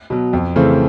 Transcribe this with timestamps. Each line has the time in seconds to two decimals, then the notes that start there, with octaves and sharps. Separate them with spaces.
0.10 B2 F#3
0.33 F2
0.56 C#3 E3 A3 C4